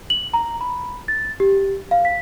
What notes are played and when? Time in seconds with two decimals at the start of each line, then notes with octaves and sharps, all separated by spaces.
0.10 F#7
0.34 A#5
0.61 B5
1.08 A6
1.40 G4
1.91 F5
2.05 B6